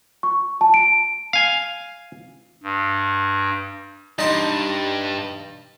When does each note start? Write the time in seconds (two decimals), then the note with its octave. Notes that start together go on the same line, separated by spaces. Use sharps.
0.23 C#6
0.61 A5
0.74 D7
1.33 F5 G#5
2.63 G2
4.19 G2 D#4 C6